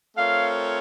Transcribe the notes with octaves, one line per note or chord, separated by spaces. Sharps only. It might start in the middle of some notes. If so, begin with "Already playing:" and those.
A3 C4 F4 A#4 C#5 F5